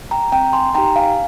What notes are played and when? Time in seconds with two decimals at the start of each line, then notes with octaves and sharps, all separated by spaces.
0.11 G5 A#5
0.32 C4 G5 A#5
0.53 G#5 C6
0.75 D#4 G4 G5 A#5
0.96 F5 G#5